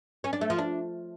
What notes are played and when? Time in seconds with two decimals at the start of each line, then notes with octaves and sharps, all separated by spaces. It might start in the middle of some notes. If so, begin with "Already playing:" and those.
0.24 C#4
0.33 D4
0.41 A3
0.50 F3
0.59 D4